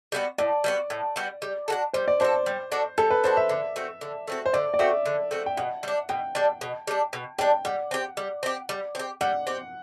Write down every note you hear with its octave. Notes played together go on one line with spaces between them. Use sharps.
G3 B3 F#4
A2 D5
G3 B3 F#4
A2
G3 B3 F#4
G3
D4 F#4 A4
G3 C5
D5
D4 F#4 A4 C5
G3
D4 F#4 A4
G3 A4
B4
D4 F#4 A4 C5
E5
D3
A3 C4 F#4
D3
A3 C4 F#4
C5
D3 D5
D5
A3 C4 F#4 E5
D3
A3 C4 F#4
G5
B2 F#5
G3 D4
B2 G5
G3 D4
B2
G3 D4
B2
G3 D4 G5
G3 F#5
C4 G4
G3
C4 G4
G3
C4 G4
G3 F#5
C4 G4